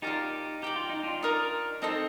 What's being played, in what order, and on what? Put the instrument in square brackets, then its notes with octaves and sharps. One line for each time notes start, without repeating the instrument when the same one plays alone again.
[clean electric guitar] D#4 G4 [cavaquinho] F4 A#4 D5 A5
[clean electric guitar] G4 [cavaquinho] D5 G5 A#5
[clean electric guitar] F4
D#4
D4 F4
[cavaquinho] D#4 A#4 D5
[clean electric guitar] C4 D#4 [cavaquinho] A4 C5 D#5 A5